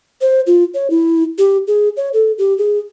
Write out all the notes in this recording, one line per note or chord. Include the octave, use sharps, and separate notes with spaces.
C5
F4
C#5
E4
G4
G#4
C#5
A4
G4
G#4